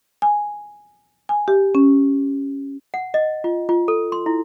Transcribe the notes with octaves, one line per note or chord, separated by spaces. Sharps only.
G#5
G#5
G4
C#4
F#5
D#5
F4
F4
A4
C6
E4